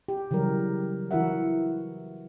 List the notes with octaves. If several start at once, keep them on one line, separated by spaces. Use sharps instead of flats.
G4
C#3 E3 F#3 G3 A#4
E3 E4 F#4 A#4 E5 F#5